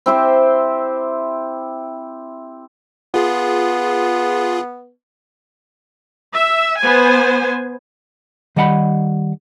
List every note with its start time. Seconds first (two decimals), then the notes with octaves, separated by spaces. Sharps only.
0.06 C4 E4 G4 C5
3.14 B3 F4 G#4
6.33 E5
6.79 B3 C5 G#5
8.56 D#3 G3 D#5 F#5 A#5 B5